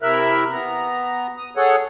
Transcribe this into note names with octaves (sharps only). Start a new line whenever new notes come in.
C3 E4 A#4 E5 F6 F#6
B3 A#5
D#6
G#4 A4 C#5 F#5